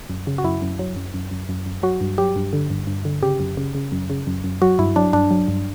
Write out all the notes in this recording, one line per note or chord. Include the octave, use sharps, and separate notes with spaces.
F#2
C#3
F#4
F#2 E4
F#2
F#3
F#2
F#2
F#2
F#2
F#2
F#3 F#4
G2
F#3 G4
G2
D3
G2
G2
D3
C#3 G4
F#2
C#3
C#3
F#2
C#3
F#2
F#2
F#3 F#4
G2 E4
F#3 D4
G2 D4
F#3
G2